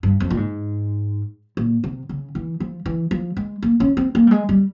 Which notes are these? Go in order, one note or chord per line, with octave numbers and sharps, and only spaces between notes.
G2
F2
A#2
G#2
A#2
C3
C#3
E3
F3
E3
F3
G#3
A#3
C#4
C4
A#3
G3
G#3
G3